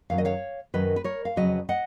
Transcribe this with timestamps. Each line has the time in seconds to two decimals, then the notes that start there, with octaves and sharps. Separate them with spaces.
0.10 F#2 D#3 F#3 F5
0.18 D#5
0.25 C#5 F5
0.74 F#2 D#3 F#3 B4 D#5
0.96 B4
1.04 A#4 C#5
1.25 F5
1.36 F2 C#3 F#3 B4 D#5
1.69 D#5 F#5